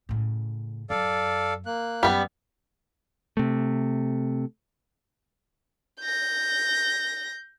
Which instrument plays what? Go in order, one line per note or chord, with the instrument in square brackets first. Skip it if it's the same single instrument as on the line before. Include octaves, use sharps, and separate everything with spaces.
[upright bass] A2 C#3
[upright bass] F#2 [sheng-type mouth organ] A4 D5 F5
[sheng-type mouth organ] A#3 F#6
[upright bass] F#2 [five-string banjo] G3 B3
[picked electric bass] C3 A3
[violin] G6 A#6